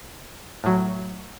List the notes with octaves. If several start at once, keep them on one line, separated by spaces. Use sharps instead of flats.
A2 F#3